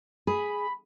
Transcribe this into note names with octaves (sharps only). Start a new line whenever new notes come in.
G#4 B5